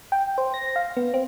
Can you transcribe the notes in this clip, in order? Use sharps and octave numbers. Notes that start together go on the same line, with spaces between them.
G5
C5
A#6
F5
B3
C4